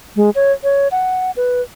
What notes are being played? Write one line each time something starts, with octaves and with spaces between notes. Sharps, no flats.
G#3
C#5
C#5
F#5
B4